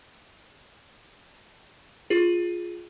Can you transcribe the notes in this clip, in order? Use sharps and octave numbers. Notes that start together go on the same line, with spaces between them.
F4 G#4